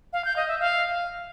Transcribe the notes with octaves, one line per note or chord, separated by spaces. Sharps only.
F5
G6
D#5
E5
F5